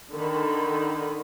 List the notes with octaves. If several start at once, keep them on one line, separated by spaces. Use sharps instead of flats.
D3 D#3 B5